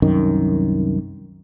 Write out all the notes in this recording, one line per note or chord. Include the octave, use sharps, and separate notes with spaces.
C2 F#2 D#3